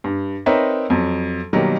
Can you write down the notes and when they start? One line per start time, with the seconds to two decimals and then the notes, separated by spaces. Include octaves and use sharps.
0.04 G2
0.46 C4 D#4 A#4 B4 C#5 E5
0.90 F2 F#3
1.53 B2 D#3 F#3 G3 A#3